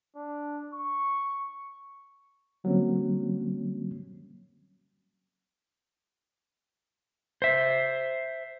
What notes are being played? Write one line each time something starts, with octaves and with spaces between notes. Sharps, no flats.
D4
C#6
D3 F#3 G3 A#3 C4 C#4
C5 E5